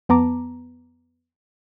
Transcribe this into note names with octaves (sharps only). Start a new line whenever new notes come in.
F2 B3 A5 A#5 D6